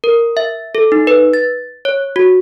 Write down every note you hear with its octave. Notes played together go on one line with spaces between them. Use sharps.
A#4
E5
A4
D#4
B4
A6
C#5
F#4